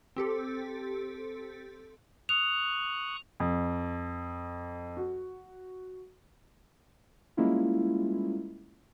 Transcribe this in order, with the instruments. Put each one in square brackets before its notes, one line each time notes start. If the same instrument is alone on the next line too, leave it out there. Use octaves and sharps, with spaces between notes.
[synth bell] C4 G4 A4
[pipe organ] C#6 D#6 F#6 [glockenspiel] F7
[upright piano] F2
F#4
[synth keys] G3 G#3 A#3 C#4 E4 F4